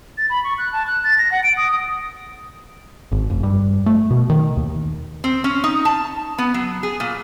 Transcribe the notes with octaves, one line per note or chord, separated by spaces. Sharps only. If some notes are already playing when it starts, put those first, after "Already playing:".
A6
B5
C#6
F#6
A5
F#6
A6
A#6
F#5
D7
D#6
D#6
G#1
F1
G2
A3
B2
D#3
D#2
C4
C#4
D#4
A5
B3
F#3
G#4
A#2